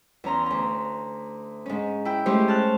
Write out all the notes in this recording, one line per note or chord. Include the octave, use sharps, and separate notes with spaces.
E2 C#4 A#5 C6
D2 A#5
G#2 C#4
E4 G5
G#3 A3 C#4 G4 C5 C#5
A5 F6 F#6